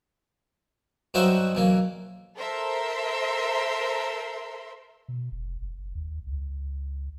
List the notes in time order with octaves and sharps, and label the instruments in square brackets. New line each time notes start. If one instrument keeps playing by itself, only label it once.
[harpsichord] G2 F#3 D#4 F#4 C5 E5
B1 E3 A#3
[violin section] A4 A#4 C5 E5 C6
[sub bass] B2
F1
F#1
D#2
C#2